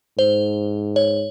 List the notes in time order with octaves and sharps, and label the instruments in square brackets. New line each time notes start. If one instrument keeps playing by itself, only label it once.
[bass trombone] G#2 [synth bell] C5
[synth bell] C#5